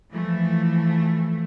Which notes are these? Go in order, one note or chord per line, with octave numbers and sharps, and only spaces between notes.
E3 F3 A3